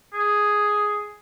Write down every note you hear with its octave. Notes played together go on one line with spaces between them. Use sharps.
G#4